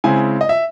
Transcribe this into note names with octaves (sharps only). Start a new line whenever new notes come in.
C#3 G#3 C4 E4 G#5
D#5
E5